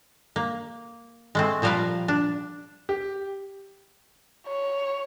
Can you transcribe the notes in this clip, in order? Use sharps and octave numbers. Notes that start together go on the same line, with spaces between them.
A#3
G#3 A3 C4
A#2 F3 G3 A#4 B4 F5
D4
G4
C#5